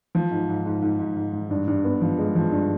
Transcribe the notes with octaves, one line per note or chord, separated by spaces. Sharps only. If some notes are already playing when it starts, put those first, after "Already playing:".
F3
G#2
G#2
G#2
G#2
G#2
G#2
G#2
G2
G2
B3
F3
G#3
F3
G2